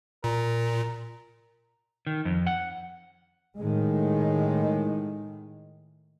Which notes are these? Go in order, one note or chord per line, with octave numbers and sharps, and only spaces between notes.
A#2 A#4
D#3
F2
F#5
A2 D#3 G#3